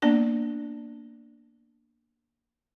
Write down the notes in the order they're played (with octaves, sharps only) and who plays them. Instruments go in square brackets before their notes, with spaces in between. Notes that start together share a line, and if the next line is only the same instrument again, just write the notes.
[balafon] A#3 B3 D4 D5 A5